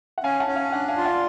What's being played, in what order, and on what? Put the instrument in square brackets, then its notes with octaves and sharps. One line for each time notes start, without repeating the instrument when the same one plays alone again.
[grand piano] F#5
[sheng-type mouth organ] C#4 [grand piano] F5 G#5
[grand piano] F#5 A5
[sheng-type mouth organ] C#4
[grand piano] C#5 F5
[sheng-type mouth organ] D4 [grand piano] D5 F#5
[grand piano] F5 G#5
[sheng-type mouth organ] F4
[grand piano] D5 F#5